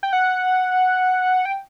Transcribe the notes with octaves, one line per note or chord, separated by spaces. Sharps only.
G5
F#5
G5